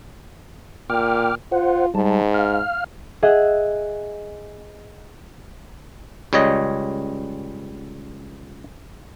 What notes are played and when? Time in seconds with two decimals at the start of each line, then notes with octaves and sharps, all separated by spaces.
0.90 A#2 G5 D6 F6
1.52 F4 C5 F#5
1.95 G#2 G3 A5
2.34 F5 F6
3.23 G#4 D#5 E5 F#5
6.33 C#2 G3 C#5 D#5